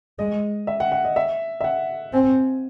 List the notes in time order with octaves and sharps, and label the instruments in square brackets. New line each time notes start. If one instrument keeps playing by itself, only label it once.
[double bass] G#3 [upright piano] D#5
[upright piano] E5
F#5
F#5
D#5
E5
E5
F#5
[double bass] C4 [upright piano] G#5